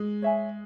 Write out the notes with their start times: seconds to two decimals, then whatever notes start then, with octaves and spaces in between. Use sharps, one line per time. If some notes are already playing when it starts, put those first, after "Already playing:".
Already playing: G#3
0.22 C#5 E5 G#5